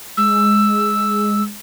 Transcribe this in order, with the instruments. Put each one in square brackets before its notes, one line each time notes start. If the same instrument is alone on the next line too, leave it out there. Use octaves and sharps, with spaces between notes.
[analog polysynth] G#3 [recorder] E6